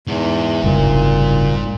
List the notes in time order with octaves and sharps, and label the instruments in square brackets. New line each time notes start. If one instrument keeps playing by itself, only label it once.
[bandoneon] E2 [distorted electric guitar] G#2
[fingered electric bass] F#1 C2 [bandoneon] A#2